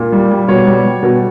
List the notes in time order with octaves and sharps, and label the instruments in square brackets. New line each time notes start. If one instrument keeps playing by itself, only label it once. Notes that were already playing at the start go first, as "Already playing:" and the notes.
Already playing: [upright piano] A#2
G3
G3
B2 C#5
G3
G3
B2